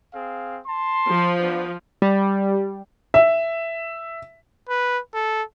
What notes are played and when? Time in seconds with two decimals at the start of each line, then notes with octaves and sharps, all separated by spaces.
0.13 C4 G#4 F5
0.66 A5 C6
1.08 F3
1.39 B3 D4 B4
2.02 G3
3.14 E5
4.69 B4
5.14 A4